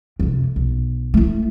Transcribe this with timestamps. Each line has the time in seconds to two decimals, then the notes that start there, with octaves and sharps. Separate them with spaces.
0.20 F2 C3
0.56 B1
1.14 A3 E4